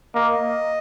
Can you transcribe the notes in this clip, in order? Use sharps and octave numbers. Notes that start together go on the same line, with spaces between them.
A#3 D#5